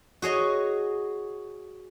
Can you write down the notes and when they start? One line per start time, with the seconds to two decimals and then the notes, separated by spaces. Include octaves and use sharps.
0.22 F#4 G#4 C#5 D#5